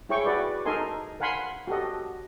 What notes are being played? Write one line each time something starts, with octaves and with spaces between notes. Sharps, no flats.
E4 G#4 C#5 G5 C#6
F#4 B4 D5
D#4 A4 A#4 D#5 G#5 C6
A#4 F5 F#5 G#5 B5 C6
F#4 G4 A4 D#5